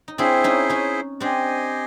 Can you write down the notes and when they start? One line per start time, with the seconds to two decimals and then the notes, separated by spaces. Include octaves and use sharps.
0.08 D#4
0.18 C4 D4 E4 G#4 C5 E5
0.44 C#4 D#4
0.69 C#4 D#4
1.20 C4 D4 G4 C5 D#5 G#5